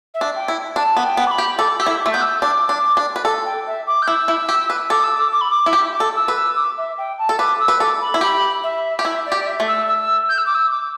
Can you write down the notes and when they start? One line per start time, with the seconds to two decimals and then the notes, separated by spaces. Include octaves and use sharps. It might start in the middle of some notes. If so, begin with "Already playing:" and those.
0.14 E5
0.21 D4
0.35 G5
0.48 E4
0.76 D4 A5
0.96 B3
1.04 G5
1.17 B3
1.26 D6
1.31 B5
1.38 G4
1.59 A4 D6
1.80 G4 E6
1.86 E4
2.00 D6
2.06 A3
2.11 B3 G6
2.21 E6
2.42 D4 D6
2.69 D4
2.97 D4
3.16 B4
3.25 A4
3.45 G5
3.66 E5
3.87 D6
4.02 G6
4.07 E4 E6
4.28 E4
4.49 G4
4.70 B4
4.90 A4 D6
5.03 E6
5.16 D6
5.32 D6
5.41 B5
5.50 D6
5.66 E4
5.73 G4 D6
5.93 D6
6.00 A4
6.15 E6
6.28 B4
6.35 E6
6.56 D6
6.77 E5
6.98 G5
7.18 A5
7.29 A4
7.39 B4 D6
7.59 E6
7.68 B4
7.80 A4 D6
8.01 B5
8.14 E4
8.21 G4 B5
8.63 E5
8.99 G4
9.04 E4 E5
9.26 D5
9.32 G4
9.38 D5
9.46 E5
9.60 A3
9.67 E6
9.87 E6
10.28 G6
10.37 E6
10.46 D6
10.54 E6
10.71 D6